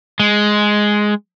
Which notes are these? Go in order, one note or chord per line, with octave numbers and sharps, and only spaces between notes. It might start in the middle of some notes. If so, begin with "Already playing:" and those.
G#3